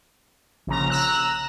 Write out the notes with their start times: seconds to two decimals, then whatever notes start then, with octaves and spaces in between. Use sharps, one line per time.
0.67 A#1 C#3 A#5
0.90 A#5 E6 F#6